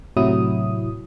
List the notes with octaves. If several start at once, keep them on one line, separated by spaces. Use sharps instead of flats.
A2 C3 F#3 E4 D#6